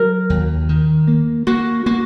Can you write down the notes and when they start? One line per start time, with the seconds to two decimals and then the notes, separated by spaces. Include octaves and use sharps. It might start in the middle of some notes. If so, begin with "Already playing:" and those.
Already playing: F#3 A#4
0.30 D#2
0.69 D#3
1.07 A#3
1.47 A#3 F#4
1.86 A#3 F#4